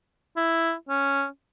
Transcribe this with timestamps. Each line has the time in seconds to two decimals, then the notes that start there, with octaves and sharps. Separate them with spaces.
0.36 E4
0.89 C#4